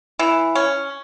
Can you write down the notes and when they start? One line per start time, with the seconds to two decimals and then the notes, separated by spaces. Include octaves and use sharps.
0.19 E3
0.55 C#4